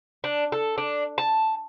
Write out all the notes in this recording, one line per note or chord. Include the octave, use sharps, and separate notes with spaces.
D4
A4
D4
A5